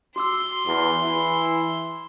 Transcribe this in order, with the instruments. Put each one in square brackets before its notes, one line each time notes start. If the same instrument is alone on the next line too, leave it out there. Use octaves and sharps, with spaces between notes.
[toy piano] F#4 D6 E6 [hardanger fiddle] C6
[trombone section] E2
E3 E4